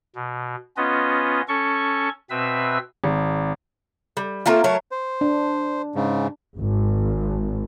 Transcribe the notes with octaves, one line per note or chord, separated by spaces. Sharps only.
B2
B3 C#4 F4 B4 D#5
C#4 A4 C#6
B2 C4 B4 E5 E6
G#1
G3
A3 A#3 C4 F4
F#3 A3 A#4 C#5
C5
D4
G#2 C#3
G#1